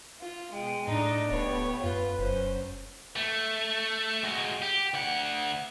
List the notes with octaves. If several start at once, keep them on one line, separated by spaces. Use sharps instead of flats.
F4
B2 G#3 G5
A2 A3 D4 D#4 D#5
D1 A3 B3 G4 C#5
F#2 F4 B4
F1 F#2 C#4 C5
A3
G#3 F#4
G4
D2 F#5